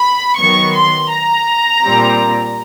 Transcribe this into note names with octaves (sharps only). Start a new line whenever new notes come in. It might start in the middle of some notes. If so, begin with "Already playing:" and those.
Already playing: B5
D#3 F#3 B3 C#6
C6
A#5
A#2 G3 C4